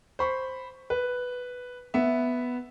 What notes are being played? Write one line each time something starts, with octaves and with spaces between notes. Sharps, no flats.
C5 B5 C#6
B4
B3 E5